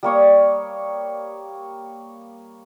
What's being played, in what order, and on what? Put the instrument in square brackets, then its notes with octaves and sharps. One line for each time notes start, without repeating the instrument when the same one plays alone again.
[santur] G3 A#3 C#5 D#6